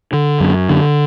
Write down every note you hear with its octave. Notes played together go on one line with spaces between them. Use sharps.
D3
F#2
D3